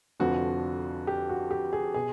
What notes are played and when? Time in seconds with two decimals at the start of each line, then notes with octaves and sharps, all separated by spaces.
0.20 F1 F2 D3 F3 F#4
1.07 G4
1.29 F#4
1.51 G4
1.73 G#4
1.94 B2 G#4